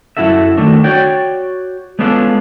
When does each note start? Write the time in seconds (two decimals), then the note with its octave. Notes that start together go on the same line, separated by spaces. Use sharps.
0.17 F#2 D3 E4 F#4 A4 E5
0.57 D#3 A3 D4 F#4
0.84 F#4 C#5 D5 G5
1.99 G#3 B3 C#4 D4 F4 A4